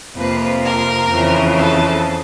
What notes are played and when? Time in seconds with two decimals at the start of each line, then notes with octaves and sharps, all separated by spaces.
0.16 F2 C3 F3 A#3 B4
0.63 A#4
1.09 F2 C#3 E3
1.56 A4